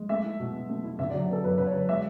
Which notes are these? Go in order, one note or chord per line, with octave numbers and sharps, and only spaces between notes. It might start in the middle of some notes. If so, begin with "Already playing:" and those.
Already playing: G#3
A3 E5
E4
B2
B2
A3
E4
D3 E5
D5
F#3
B3 A4
F#2 B4
D3 B4
C#5
F#3
G#3 E5